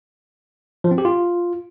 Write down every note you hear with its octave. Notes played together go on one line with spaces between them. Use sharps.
F3
C4
G4
F4